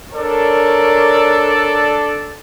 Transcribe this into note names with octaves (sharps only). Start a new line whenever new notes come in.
D4 A4 A#4 C#5 D5